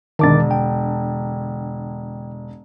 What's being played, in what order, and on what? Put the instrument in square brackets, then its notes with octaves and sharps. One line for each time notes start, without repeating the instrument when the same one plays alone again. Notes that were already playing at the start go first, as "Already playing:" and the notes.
[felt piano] E1 D3 A5 [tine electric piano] D#3 D6 A6
[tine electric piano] G5